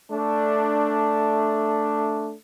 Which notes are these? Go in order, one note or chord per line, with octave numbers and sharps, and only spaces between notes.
A3 D4